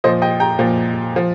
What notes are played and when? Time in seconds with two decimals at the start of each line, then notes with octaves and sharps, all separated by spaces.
0.04 A#2 F3 C5 D#5
0.22 D#5 G5
0.40 G5 A#5
0.59 A#2 F3
1.16 F3